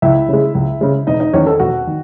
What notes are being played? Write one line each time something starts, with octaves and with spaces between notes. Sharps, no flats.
C#2 E4 E5
C#3 G#3
C#2
C#3 G#3
E1 D#4 D#5
D#4 D#5
E2 D#3 C#4 C#5
A4
E1 F#4 F#5
D#3